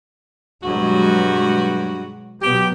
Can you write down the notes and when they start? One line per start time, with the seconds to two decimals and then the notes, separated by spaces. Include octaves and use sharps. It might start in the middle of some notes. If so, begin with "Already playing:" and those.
0.63 G2 B2 F#3 G#3 F#4
2.42 B2 F#3 B3 G4